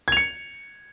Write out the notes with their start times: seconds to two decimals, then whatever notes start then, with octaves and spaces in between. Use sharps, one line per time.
0.08 G#6
0.12 F7
0.17 C#7